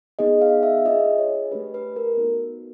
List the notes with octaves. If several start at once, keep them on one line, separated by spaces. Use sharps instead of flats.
B3 D#4 G#4 D#5
F5
E5
D4 F4 G#4 D#5
C#5
A3 D4 G4 B4
B4
A#4
B3 D#4 F#4 A4